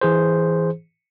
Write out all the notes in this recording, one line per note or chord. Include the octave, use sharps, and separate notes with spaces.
E3 G#4 C5